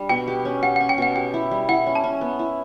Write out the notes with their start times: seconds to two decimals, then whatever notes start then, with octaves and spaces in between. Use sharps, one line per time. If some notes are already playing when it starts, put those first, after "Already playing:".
Already playing: G3 D4
0.09 B2 G5
0.28 G4
0.45 C#4
0.63 G4 F#5
0.76 F#5
0.80 C#4
0.89 G5
0.98 B2 F#5
1.16 G4 G5
1.34 E4
1.51 G3
1.69 E4 F#5
1.87 C#4
1.95 A5
2.04 C#4
2.21 B3
2.39 E4